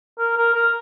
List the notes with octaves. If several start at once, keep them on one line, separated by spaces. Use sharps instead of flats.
A#4
A#4
A#4